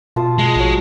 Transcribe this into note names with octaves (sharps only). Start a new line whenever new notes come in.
B2 F4 A5 D#6
G#3
A#1 F#3 D#6